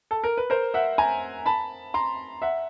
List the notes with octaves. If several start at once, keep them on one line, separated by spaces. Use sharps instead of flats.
A4
A#4
B4
A#4 C5
E5 F#5
G#5 A#5
A5 B5
A#5 C6
E5 F#5